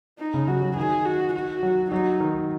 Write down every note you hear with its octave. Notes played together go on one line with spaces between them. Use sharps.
D#4
C#3
F#3 F#4
F#3
D#3 G#4
F#4
F#4
F#3
F#3 D#4
D#3